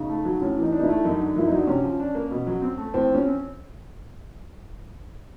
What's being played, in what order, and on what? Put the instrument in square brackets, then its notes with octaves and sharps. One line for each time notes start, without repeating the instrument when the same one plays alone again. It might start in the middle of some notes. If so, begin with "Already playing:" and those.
Already playing: [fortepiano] C#3 [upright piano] D#4
[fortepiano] A3
F#3
[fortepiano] A2 [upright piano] C#4
[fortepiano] E3
[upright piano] D#4
[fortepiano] D4
[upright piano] D#4
E4
[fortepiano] A3
[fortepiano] F#2 [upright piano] D#4
[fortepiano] D3
[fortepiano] F#2 [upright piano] E4
[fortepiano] F#3 [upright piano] D#4
[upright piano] D4
[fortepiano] C3 [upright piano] C#4
[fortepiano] F3
D4
A#3
B2
F#3
C4
A3
[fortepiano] A2 [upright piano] C4
[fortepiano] F3
[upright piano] C#4
[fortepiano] C4